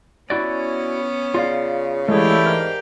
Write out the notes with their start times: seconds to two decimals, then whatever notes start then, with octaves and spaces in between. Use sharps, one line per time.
0.30 B3 C#4 E4 F#4 D5
1.34 C#3 F4 D5 F5
2.09 E3 G#3 A3 E4 G4 G#4 D5 F5
2.46 G#2 A#4